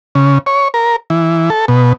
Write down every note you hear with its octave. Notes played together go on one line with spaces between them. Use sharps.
C#3
C#5
A#4
E3
A4
B2